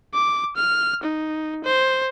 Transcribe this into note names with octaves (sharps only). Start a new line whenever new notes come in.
D6
F6
D#4
C5